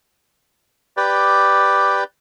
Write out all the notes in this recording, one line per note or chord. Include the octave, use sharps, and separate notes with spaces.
G4 B4 D5